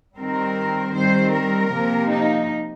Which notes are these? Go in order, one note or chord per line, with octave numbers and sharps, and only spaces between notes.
D#3 G3 C4 A#4
D#3 G3 C4 C5
A#4
C3 F3 A#3
D#4